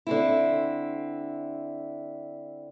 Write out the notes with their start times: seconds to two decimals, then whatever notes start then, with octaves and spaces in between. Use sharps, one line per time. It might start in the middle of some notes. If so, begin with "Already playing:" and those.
0.07 D3 C4 E4